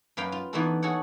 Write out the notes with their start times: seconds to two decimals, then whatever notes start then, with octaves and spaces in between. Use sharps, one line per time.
0.17 F#2 B4 F5 G5
0.32 F4
0.53 E3 B3 D4 D#4 F#4 A4
0.82 F#4 G#4 A4 C#5 F#5